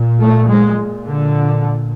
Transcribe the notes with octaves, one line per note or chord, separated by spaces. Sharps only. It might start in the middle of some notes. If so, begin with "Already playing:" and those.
Already playing: A#2
A3
G#3
A#2
D3